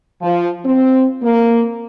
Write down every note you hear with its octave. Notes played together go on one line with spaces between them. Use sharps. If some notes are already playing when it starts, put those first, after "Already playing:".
F3
C4
A#3